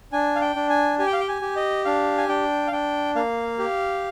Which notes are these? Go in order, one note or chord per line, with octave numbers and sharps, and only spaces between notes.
D4 G#5
F5
G5
D4
G#5
G4 G#5
G5
F5
G5
G#5
G4
D#5
D4 F5
G#5
D4 G5
F5
D4 G5
A#3 F5
G4